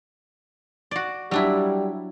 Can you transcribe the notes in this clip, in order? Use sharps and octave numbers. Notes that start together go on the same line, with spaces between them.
F#4 D5
F#3 G3 D4 E4